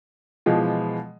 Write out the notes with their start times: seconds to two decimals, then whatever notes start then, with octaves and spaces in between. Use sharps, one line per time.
0.46 B2 E3 F3 G#3 F4